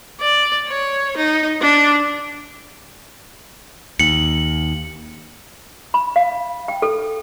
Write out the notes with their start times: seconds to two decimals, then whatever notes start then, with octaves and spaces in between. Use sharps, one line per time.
0.20 D5
0.68 C#5
1.17 D#4
1.62 D4
4.00 D#2 C#7 F#7
5.94 B5
6.16 F5
6.68 G5
6.82 A4